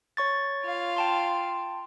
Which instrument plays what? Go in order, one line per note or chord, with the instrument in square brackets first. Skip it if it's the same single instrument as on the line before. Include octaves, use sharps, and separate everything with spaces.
[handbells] C#5 C#6 A6
[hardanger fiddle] F4 F5
[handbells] G5 A5 C6